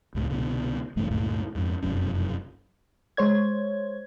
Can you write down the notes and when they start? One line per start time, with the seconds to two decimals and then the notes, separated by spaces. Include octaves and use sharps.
0.15 C#2 A2
0.30 C2 B2 D3
0.96 A1 G2 C#3 A3
1.11 D2 G2 A#2 A3
1.55 F2 G#2
1.82 F1 B1 F#2 C#4
3.17 G#3 C5 C#5 G#6